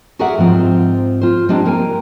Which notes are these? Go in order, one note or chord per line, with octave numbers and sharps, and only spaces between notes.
F#4 G#4 A#4 D5 E5 F#5
G#2 F3 C4 F4
F4 C5
G3 G#3 C4 D4 D#4
A#3 A#4 G5 G#5 A#5